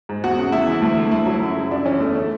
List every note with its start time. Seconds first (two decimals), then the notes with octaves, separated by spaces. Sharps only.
0.09 G#2
0.24 E2 F#4
0.38 C#3
0.52 E2 E4
0.67 E3
0.82 D2
0.97 D3
1.11 D2 E4
1.26 F#3
1.42 F#2
1.56 C#3
1.71 F#2 D4
1.85 E3 C#4
2.00 E2 A3
2.15 D3 A3